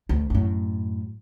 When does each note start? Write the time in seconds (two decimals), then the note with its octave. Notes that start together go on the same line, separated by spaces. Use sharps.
0.09 D2
0.30 F#2 A2